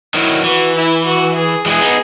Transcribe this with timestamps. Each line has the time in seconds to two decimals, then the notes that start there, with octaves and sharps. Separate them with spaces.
0.14 D#3 F#3 E4
0.44 E3 F#4
0.76 E4
1.05 F#4
1.36 G#4
1.66 E3 G#3 G#4
1.81 B3 D#4